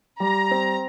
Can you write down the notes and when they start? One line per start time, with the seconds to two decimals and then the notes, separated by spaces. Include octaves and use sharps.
0.20 G3 A#5
0.51 C4